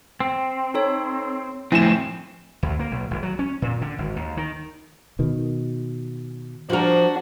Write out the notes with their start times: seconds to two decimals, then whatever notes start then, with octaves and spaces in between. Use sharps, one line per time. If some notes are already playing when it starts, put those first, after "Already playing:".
0.20 C4
0.74 D#4 A4 C#5
1.72 F2 A2 C4 E4 G#5 E7
2.63 D2
2.79 A#3
2.91 B1
3.11 G#1
3.23 F#3
3.39 C#4
3.62 A#2
3.82 D3
3.98 G#1
4.16 D#2
4.37 D#3
5.19 B2 D#3
6.70 F3 D4 F#4 A#4